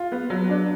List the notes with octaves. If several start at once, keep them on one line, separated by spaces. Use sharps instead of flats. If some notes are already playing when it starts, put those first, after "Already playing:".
Already playing: F4
B3
F#3
D4